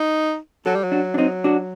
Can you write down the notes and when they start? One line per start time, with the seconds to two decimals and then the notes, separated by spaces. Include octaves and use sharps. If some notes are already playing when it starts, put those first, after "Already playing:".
Already playing: D#4
0.66 F#3 F#4 A4
0.75 G3
0.83 F#3
0.92 D4 F#4
1.14 D4
1.18 C4 D#4
1.44 D4 F#4